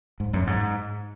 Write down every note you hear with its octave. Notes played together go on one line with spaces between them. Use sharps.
G#2
F#2
G#2